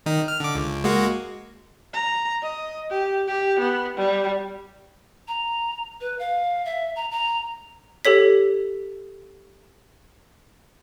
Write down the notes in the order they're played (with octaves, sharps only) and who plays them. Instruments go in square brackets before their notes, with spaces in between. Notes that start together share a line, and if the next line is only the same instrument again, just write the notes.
[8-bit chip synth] D#3 D#4
F6
D3 D6
C#2
G#3 A#3 F#4
[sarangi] A#5
D#5
G4
G4
B3
G3
[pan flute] A#5
B4
F5
E5
A#5
A#5
[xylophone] G4 A4 C#5 B6